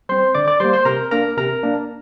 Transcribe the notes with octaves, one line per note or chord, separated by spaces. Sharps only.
G3 C4 C5 C6
D3 D5 D6
D5 D6
G3 A#3 C5 C6
C5 C6
C3 A#4 A#5
A#3 D4 A#4 A#5
C3 A#4 A#5
A#3 D4